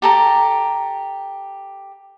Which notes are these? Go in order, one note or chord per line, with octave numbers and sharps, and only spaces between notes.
G4 A4 A#5